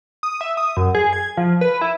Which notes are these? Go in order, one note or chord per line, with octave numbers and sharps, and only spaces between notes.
D#6
E5
D#6
F#2
G#4
G#6
F3
B4
E4